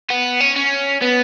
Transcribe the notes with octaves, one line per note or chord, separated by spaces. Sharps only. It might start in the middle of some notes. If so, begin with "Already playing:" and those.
B3
C#4
C#4
B3